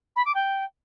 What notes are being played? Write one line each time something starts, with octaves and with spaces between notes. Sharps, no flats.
B5
D6
G5